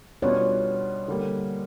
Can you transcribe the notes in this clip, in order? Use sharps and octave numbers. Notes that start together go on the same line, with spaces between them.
B2 G3 B3 D4 F4 C#5
D3 G3 A#3